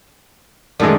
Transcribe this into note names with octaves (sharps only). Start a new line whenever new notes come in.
F#2 A#2 D#3 G#3 A3 D4